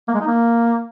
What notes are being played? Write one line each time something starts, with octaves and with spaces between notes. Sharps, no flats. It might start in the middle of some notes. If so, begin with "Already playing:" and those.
A#3
G#3
D#4
A#3